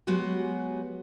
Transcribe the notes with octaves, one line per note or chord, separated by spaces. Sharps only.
F#3 G#3 B3 F#4 G4